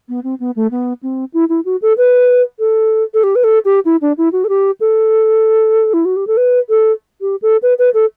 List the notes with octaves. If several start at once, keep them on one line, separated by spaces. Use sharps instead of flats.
B3
C4
B3
A3
B3
C4
E4
E4
F#4
A4
B4
A4
A4
G4
B4
A4
G4
E4
D4
E4
F#4
A4
G4
A4
E4
F#4
G4
A4
B4
A4
G4
A4
B4
B4
A4